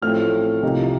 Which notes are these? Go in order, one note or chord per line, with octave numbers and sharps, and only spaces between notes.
A1 A2 F3 A3 C4 F6
C2 C3 F3 A#3 D#4